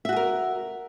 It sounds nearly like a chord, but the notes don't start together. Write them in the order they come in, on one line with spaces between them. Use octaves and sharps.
E5 F#4 G#4 A#4